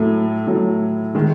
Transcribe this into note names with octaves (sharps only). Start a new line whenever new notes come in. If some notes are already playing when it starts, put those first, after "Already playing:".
Already playing: A2 F#3 A3
A2 F#3 A3
D#3 G#3